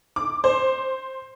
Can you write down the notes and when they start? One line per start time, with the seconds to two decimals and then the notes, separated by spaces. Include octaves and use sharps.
0.16 D6
0.44 C5